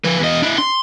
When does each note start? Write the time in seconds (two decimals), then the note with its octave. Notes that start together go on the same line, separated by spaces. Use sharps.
0.04 F3 B4
0.20 E2 D#5
0.42 D4 E4
0.58 C6